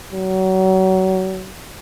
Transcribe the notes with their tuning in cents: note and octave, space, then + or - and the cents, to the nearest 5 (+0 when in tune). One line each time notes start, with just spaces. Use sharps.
F#3 +30